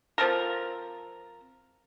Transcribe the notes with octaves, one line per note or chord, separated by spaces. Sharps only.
F3 C4 A4 A#4